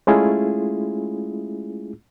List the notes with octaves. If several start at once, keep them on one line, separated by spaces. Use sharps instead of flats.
G#3 A3 C#4 E4 F4 G#4